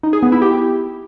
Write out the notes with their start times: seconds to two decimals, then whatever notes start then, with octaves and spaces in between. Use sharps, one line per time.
0.03 D#4
0.13 G#4
0.23 B3
0.32 E4
0.42 G4